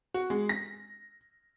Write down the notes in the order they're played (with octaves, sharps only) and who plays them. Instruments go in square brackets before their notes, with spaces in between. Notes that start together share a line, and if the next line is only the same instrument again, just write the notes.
[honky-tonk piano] F#4
G#3
A#6